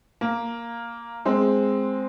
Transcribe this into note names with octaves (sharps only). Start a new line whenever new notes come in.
A#3
G#3 C4